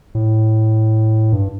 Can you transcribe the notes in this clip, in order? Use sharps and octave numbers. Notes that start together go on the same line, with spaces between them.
A2
G2